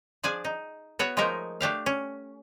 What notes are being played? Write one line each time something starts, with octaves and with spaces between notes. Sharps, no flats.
F3 D4 G#4 D5 G#5
D#4
B3 F#4 C#5 E5 F#5
F3 G#3 A3 D#4 A#4 E5
A3 D4 G4 F5
C#4